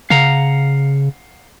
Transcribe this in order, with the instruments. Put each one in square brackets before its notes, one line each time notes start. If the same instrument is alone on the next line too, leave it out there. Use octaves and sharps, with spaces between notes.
[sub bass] C#3 [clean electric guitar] F5 F#5 A#5